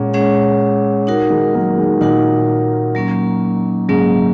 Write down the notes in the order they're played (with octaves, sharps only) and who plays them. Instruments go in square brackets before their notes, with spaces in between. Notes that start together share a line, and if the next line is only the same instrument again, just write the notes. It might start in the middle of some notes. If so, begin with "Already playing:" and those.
Already playing: [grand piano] A#2 [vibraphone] G#3 C#4 G#4 C#5 F#5
[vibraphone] G#3 C#4 G#4 C#5 F#5
D#4 F#4 A#4 F#5
[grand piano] D#3 G#3
F#3 A#3
D#3 G#3
[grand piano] A#2 D#3 [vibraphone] D#4 F#4 A#4 F#5
[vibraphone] F#3 A#3 C#4
[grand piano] G#2 C#3 [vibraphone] F#3 A#3 C#4